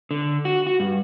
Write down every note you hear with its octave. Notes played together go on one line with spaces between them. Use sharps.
D3
F#4
F#4
G2